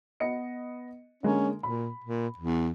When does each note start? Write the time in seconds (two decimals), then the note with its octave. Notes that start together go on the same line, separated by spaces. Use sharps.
0.20 B3 D#5 C#7
1.23 D3 G#3 A#3 C#4
1.63 A#2 B5
2.04 A#2
2.38 E2